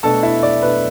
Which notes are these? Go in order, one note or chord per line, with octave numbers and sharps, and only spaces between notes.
B2 A3 D4 A4 A5
E4 E5
D5
B2 A3 D4 B4